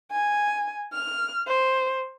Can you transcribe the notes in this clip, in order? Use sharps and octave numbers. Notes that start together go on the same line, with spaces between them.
G#5
F6
C5